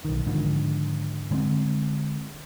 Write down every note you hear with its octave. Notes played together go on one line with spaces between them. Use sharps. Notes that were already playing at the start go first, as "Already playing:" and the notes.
B1 D#3
G#2 D3 D#3 F3
D3 G#3 B3 C4